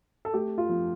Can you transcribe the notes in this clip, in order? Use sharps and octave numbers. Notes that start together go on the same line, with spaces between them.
A4
A3 G4
F4
F3